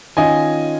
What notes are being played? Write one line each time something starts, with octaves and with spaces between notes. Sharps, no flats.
D#3 C#4 F4 D#5 G#5